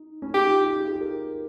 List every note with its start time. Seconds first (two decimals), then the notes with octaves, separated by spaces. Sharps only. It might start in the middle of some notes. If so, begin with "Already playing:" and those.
Already playing: D#4
0.22 C#4
0.34 D#4 G4
0.48 F4
0.64 G4
0.79 G#4
0.85 G4
0.93 G#4
1.01 A#4